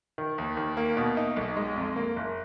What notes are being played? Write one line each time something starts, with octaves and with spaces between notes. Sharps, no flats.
D#3
D#2
D#2
A#3
B2
D#4
B1
G#3
F2
A#3
F#1